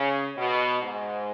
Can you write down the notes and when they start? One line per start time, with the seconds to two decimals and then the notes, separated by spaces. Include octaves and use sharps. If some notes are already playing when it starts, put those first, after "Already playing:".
Already playing: C#3
0.37 B2
0.82 G#2